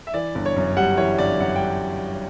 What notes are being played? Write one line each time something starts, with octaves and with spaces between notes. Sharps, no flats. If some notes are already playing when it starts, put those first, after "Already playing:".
E5
E3 D5
G1
C#5
F#2
G3 F#5
E3 C#5
G1 D5
F#2 F#5
G5
G3